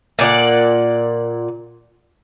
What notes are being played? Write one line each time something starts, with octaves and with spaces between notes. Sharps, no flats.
A#2 D5 F#5